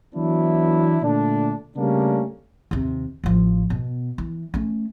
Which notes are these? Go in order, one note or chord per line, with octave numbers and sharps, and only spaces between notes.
E3 F#3 B3 D4 E4
A#2 D3 A3 D4
C#3 G3 A3 A#3 C#4 D4
D#2 C3
A1 F3
B2
E3
A3 C#4